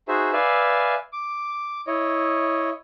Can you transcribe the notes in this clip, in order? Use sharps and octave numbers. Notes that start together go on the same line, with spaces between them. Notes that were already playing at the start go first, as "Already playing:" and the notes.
D#4 F#4 G#4 C5 E5
B4 D5 E5 F5 G#5
D6
E4 C#5 D#5